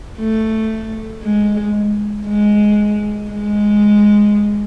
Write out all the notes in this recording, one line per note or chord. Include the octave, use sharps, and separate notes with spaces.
A3
G#3
G#3
G#3